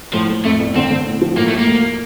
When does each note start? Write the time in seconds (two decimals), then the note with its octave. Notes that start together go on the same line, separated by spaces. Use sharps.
0.13 A2 F3
0.29 A2
0.45 F2 A3
0.60 G1
0.76 D3 C4
0.90 D3
1.06 A2
1.21 F3
1.37 A2 A#3
1.47 A3
1.53 A2
1.58 A#3
1.68 D2